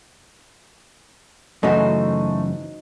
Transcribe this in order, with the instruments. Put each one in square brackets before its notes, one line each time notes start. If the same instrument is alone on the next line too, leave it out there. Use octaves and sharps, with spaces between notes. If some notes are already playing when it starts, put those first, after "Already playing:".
[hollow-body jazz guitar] F#2 C#3 E3 [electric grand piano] A3 [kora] D#4 F#4 C5